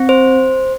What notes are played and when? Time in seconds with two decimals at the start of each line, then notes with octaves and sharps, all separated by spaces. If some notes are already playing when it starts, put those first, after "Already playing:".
Already playing: C4
0.09 C5